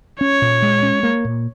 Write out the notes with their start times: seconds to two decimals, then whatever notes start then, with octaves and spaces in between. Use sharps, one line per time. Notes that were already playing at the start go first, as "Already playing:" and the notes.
0.21 C#4 C#5
0.42 A#2
0.62 G#3
0.82 C#4
1.03 A#3
1.25 A#2